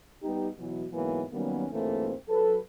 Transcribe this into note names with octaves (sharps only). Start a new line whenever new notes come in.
G3 B3 D#4 G4
B2 E3 F#3
G#2 B2 E3 F#3 A#3 B3
D#3 F#3 G3 A#3 B3 C#4
D2 G#2 E3 A3 A#3 C4
F#3 A4 B4